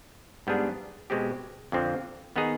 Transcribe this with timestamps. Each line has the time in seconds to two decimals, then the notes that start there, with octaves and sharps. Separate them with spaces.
0.47 G#2 G3 B3 D4 G#4
1.10 B2 G#3 C4 G4
1.72 F2 D3 F3 C4
2.36 D#3 B3 D#4 G#4